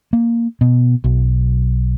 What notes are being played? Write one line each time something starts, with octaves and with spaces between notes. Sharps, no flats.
A#3
B2
B1